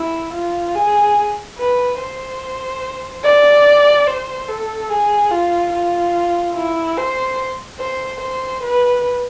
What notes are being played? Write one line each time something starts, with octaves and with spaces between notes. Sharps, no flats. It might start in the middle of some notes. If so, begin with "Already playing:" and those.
Already playing: E4
F4
G#4
B4
C5
D5
C5
A4
G#4
F4
F4
E4
C5
C5
C5
B4